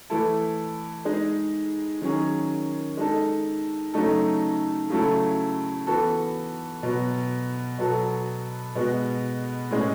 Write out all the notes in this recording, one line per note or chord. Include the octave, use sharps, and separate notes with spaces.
E3 A3 E4 A4
G#3 D#4 G#4
D#3 F#3 C#4 G#4
G#3 D#4 A4
C#3 F#3 A3 D#4 A4
C#3 F#3 A3 E4 A4
E3 B3 F#4 A4
B2 F#3 B3 F#4
B2 F#3 B3 F#4 A4
B2 G#3 B3 F#4
A2 G#3 C#4 G#4